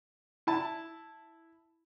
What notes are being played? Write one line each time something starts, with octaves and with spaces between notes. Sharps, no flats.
E4 A5